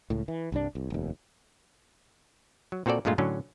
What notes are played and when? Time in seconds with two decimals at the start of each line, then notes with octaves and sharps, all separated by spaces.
0.10 C#2 A2
0.28 E3
0.52 C2 G2 D4
0.75 C2
0.90 F1 D#2
2.72 F#3
2.86 A#2 C4 F#4 A4 D5
3.05 G2 A#2 G#3 A3 F4
3.18 A2 D3 F#3 C#4